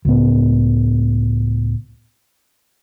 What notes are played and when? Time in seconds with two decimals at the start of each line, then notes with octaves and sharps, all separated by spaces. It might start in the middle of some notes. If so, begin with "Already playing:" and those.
0.05 C#2 A2 B3